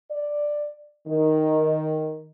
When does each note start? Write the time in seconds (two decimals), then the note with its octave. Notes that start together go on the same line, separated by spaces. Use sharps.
0.11 D5
1.08 D#3